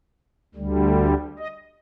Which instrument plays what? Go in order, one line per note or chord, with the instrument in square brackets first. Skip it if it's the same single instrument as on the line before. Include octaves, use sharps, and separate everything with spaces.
[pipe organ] D2 D3 G3
D#5